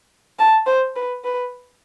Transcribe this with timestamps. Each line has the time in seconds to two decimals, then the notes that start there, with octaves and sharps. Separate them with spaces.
0.39 A5
0.66 C5
0.96 B4
1.24 B4